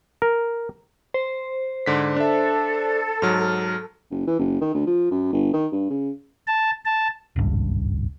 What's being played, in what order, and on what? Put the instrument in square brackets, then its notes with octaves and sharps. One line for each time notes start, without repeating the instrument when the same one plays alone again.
[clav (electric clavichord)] A#4
[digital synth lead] C5
[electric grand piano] G#2 D3 B6
[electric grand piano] D4 E5 [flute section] A4
[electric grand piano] G#2 F#3 [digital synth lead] F6
[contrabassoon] F#1
E3
F#1
D#3
D2
F3
F#2
G1
D#3
G2
C#3
[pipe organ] A5
A5
[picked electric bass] D#1 G#1 C#2 G2